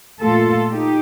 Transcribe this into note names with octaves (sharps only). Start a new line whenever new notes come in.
A#2 A3 F4 A4
D#4 G4